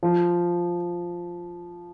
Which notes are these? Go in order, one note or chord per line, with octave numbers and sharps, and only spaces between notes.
F3